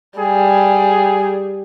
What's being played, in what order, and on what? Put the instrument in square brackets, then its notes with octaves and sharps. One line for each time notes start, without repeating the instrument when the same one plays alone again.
[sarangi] G3 [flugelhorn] G#4